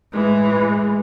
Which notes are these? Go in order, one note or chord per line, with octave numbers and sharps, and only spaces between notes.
A2 E3 G#3
G#3